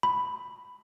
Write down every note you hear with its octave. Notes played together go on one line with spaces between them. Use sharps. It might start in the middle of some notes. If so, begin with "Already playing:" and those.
B5